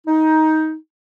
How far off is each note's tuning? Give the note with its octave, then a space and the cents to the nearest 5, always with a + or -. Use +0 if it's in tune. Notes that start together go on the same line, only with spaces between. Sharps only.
D#4 +15